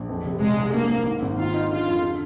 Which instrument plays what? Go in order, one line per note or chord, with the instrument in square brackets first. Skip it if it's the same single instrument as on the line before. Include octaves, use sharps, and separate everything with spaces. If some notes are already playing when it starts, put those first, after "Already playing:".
Already playing: [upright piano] A#1
F2
F1
[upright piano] C3 [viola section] G#3
[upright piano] C2
[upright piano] G2 [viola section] A#3
[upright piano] G#1
G#2
G#1
[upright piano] D#3 [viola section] F4
[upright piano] D#4
[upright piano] D3 [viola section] F4
[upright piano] F2
D3